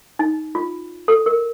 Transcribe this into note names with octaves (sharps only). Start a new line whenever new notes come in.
D#4
F4
A4
A#4